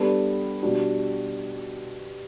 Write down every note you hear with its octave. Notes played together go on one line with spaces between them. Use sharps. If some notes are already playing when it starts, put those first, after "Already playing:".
Already playing: G3 B3 D4 A4
B2 G3 D4 F#4